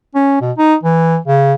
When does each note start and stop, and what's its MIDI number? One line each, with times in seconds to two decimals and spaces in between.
0.15 0.37 61
0.41 0.52 47
0.58 0.75 63
0.83 1.18 52
1.27 1.54 49